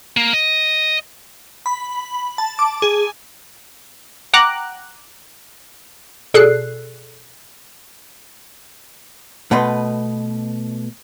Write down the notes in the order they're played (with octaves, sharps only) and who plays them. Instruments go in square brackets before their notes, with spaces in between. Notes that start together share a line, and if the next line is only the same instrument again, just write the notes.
[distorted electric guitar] A#3
D#5
[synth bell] B5
A5
D6
G#4
[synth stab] F#5 G5 A#5 D6 F#6
[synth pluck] B2 G#4 A4 D5 F#6 C7
[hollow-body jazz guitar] B2 A3 B4 D#5 C6